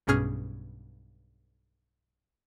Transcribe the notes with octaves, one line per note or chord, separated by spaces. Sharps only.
B1 G2 B2 C#4 G#4 F6